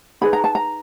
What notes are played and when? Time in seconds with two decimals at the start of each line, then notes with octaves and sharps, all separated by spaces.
0.21 D#4 G#4 B4 B5
0.33 A#5
0.44 A5
0.55 A#5